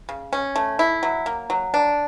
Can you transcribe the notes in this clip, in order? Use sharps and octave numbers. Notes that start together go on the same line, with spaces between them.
C#3
C#4
A3
E4
F#3
A#3
F#3
D4